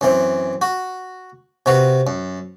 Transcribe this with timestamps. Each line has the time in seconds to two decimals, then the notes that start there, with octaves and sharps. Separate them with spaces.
0.01 F#2 E3 C4
0.62 F#4
1.66 C3 F#4 B4
2.07 F#2